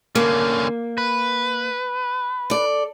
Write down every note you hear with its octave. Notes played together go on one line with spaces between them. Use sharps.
D3 A#3 C#4
B4
A4 D5